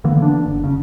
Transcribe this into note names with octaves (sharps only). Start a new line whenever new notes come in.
D3 E3 A#3 B3
D4
F#1
C#3